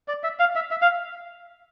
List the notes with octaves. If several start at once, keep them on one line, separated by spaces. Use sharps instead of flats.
D5
E5
F5
E5
E5
F5